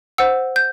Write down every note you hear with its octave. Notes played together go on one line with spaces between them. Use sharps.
C5 F#5 E6
G6